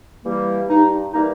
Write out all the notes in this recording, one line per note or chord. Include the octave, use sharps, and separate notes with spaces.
E3 G3 A#3
G2 D#4
E3 G3 A#3 D#4